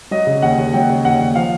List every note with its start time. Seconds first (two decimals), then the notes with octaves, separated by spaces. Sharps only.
0.11 F#3 D#5
0.27 C#3
0.42 D#2 F#5
0.58 D#2
0.73 F#3 G5
0.89 C#3
1.05 D#2 F#5
1.21 D#2
1.35 F3 F5